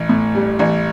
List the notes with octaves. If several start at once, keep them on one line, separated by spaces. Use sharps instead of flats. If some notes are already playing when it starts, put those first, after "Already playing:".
Already playing: A1
A2
G3
A1